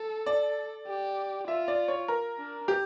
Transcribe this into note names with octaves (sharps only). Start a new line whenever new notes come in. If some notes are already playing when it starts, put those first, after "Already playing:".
Already playing: A4
D5
G4
F4 E5
D5
C#5
A#4
D4
G4